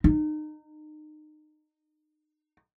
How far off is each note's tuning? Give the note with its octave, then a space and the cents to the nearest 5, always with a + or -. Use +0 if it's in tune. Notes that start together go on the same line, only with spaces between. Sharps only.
D#4 -25